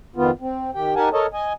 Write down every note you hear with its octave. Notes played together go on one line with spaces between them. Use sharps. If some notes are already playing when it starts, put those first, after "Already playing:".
F2 D#3 B3 F4
C4
D#3 G4 G5
D#4 G4 A#4 F#5 G#5 A5
A4 A#4 C#5 D#5 A5
D#5 G#5